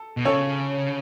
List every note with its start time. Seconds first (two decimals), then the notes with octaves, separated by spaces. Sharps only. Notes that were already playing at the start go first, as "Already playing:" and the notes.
Already playing: A4
0.17 B2
0.25 C#3 A4 C#5